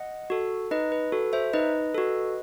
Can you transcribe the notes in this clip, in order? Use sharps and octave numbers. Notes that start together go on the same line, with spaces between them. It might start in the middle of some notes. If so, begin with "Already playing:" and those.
Already playing: D#5 F#5
F#4 A4
D#4 B4 D#5
B4
F#4 A4
C5 E5
D#4 B4 D#5
F#4 A4